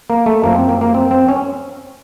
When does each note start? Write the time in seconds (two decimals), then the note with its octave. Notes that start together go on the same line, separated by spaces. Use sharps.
0.10 A#3
0.26 A3
0.43 F#2 F3 A#3
0.55 C4
0.69 A#3
0.81 A#3
0.94 C4
1.11 C4
1.29 C#4